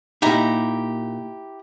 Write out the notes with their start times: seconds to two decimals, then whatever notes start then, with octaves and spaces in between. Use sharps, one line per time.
0.22 A#2 D#4 E4 G4 A#5